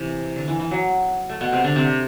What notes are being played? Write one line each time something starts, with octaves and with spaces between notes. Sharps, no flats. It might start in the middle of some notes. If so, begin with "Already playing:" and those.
Already playing: C3 E3
D3
E3
E3
F#3
A3
B2 B3
C3 C4
D3 D4
C3 C4